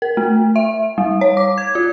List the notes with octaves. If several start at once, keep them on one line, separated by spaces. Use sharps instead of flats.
A#4
A3
E5
G3
C#5
D6
G#6
F4